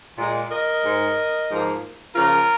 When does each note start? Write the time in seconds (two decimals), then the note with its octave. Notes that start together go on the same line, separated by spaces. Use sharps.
0.18 A#2 G#3
0.51 A#4 D#5
0.84 G#2 G#3
1.50 G#2 F3 A#3
2.15 C#3 F3 A#3 F4 A#4